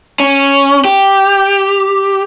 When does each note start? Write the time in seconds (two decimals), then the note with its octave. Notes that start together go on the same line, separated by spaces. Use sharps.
0.20 C#4
0.85 G4